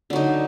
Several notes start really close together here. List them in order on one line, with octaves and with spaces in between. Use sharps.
D3 F#3 D#4